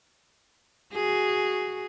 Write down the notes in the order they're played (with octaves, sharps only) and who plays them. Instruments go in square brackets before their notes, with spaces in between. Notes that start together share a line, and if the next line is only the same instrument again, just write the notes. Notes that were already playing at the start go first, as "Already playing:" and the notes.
[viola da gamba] F#4 G#4